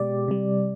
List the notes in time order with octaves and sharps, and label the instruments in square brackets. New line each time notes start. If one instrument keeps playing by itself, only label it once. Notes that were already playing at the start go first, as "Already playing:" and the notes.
Already playing: [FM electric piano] B2 G#3 G4 D5
C3 G3